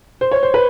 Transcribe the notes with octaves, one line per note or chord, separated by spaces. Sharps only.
C5
C#5
C5
B4